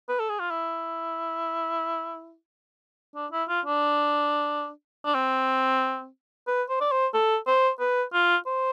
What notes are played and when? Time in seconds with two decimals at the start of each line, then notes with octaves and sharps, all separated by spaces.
0.09 B4
0.19 A4
0.29 G#4
0.40 F4
0.50 E4
3.15 D4
3.32 E4
3.49 F4
3.65 D4
5.05 D4
5.14 C4
6.47 B4
6.69 C5
6.81 D5
6.91 C5
7.14 A4
7.47 C5
7.80 B4
8.13 F4
8.47 C5